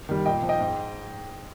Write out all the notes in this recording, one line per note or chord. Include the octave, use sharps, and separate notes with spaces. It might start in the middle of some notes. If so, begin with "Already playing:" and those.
D#3 G3
A#2 D#5 G5
F3
D#5 G5
G#2